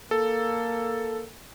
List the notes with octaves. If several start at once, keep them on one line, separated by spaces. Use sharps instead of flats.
A#3 A4